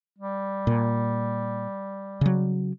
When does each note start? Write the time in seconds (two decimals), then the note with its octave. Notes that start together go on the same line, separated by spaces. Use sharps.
0.18 G3
0.67 A#2
2.21 C#3 F#3